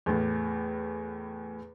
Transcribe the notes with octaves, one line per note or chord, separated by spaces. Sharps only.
E2 A2